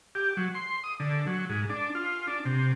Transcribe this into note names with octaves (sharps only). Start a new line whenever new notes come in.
G4
F#3
C6
D#6
D3
F#3
G#2
D4
F4
D4
C3